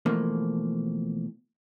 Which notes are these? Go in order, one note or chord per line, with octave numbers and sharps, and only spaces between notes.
B2 E3 F3 A3 A#3